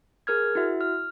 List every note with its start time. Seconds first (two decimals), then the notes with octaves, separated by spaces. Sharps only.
0.27 G#4 A#4 F6 G#6
0.55 E4 F#4 E5
0.81 F6